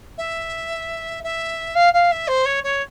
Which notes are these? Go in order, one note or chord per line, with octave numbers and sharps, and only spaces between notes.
E5
E5
F5
F5
E5
C5
C#5
C#5